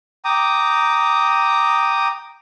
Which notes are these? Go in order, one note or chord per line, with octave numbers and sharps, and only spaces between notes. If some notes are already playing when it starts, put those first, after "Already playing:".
G5 A#5 D6 D#6